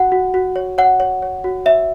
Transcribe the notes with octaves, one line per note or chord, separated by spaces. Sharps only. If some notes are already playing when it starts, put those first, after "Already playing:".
Already playing: F#4 F#5
F#4
F#4
C#5
C#5 F#5
C#5
C#5
F#4
C#5 E5